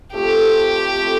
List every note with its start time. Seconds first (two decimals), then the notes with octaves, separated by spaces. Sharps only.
0.14 F3 A3 C4 G4
0.98 F3 A3 C4